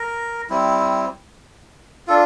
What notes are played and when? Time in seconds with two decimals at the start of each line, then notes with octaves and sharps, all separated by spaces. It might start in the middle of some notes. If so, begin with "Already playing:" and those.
Already playing: A#4
0.50 G3 C4 E4
2.08 D4 F4 A4